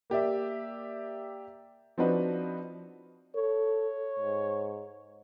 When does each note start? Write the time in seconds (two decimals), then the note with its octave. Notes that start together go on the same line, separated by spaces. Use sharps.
0.10 A#3 G4 D5 E5
1.98 F3 C4 D4 D#4 F#4 B4
3.36 A4 C#5
4.19 G#2